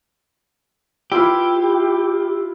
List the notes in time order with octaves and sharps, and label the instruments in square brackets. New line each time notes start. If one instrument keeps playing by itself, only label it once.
[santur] E4 F4 B4 [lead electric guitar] G4